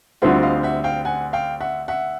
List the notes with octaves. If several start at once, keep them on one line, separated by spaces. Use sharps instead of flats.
D2 D3 G3 C4 F4 E5 F#5
D#5 F5
E5 F#5
F5 G5
F#5 G#5
F5 G5
E5 F#5
E5 F#5